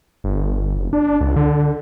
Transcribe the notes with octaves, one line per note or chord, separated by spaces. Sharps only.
G1
F#1
D4
C#2
D3